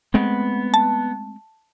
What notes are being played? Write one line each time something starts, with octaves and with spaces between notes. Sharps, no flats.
G#3 A3 B3 C4
A5